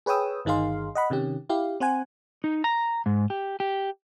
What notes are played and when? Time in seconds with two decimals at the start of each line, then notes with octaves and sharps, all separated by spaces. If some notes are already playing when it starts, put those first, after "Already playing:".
0.06 G#4 B4 C#5 G5 D#6 E6
0.45 G1 D#3 D#4 G#4 F5 C6
0.95 D#5 F#5 B5
1.10 C3 D#3 C#4 G4
1.49 E4 G4 F5
1.80 C4 C5 F#5 G#5
2.44 D#4
2.64 A#5
3.06 G#2
3.30 G4
3.60 G4